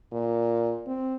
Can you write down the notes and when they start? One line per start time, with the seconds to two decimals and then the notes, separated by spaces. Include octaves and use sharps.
0.12 A#2
0.87 C4